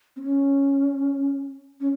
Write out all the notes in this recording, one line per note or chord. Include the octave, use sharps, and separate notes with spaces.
C4
C#4
C#4